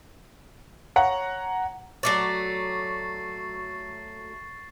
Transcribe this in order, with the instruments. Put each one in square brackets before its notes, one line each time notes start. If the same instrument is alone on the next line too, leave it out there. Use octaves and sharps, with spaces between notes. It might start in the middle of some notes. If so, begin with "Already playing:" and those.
[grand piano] C#5 F#5 A#5
[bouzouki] F#3 A3 D5 [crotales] C#6 A6 C7